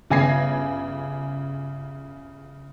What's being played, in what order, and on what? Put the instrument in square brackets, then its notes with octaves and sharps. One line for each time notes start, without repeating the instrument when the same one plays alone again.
[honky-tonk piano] G1 C#3 G#5 G#6 A#6 C7